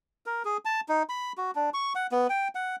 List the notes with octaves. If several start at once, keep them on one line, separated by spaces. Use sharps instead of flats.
A#4
G#4
A5
D#4
B5
F#4
D4
C#6
F#5
B3
G5
F#5